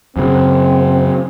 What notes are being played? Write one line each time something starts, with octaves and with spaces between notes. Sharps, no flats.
F#2 C#3 C4